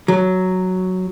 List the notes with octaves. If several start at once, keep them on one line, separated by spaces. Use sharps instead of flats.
F#3